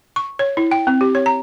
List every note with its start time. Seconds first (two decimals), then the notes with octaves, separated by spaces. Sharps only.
0.16 C#6
0.39 C#5
0.57 E4
0.71 G5
0.87 C4
1.01 G4
1.15 C#5
1.26 A#5